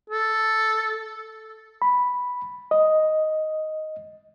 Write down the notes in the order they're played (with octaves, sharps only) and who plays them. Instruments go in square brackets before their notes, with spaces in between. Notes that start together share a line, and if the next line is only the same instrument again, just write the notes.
[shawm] A4
[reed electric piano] B5
D#5